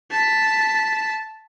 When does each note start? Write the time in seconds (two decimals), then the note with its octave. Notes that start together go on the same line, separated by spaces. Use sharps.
0.11 A5 B6